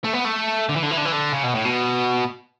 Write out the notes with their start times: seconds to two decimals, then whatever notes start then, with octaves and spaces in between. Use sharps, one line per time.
0.04 A3
0.14 B3
0.25 A3
0.69 D3
0.76 E3
0.83 D3
0.91 E3
0.97 D3
1.05 E3
1.12 D3
1.33 C#3
1.43 B2
1.55 A2
1.65 B2